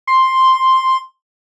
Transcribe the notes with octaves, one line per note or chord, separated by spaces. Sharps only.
C6